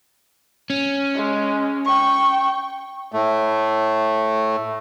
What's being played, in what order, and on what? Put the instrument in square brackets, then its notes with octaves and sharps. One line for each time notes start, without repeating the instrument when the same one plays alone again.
[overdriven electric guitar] C#4
[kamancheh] G#3
G5 C#6
[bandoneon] A2 A3